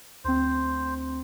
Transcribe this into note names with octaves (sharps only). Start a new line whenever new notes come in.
D2 C4 C5